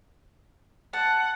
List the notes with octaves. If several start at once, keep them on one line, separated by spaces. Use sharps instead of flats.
F#5 A5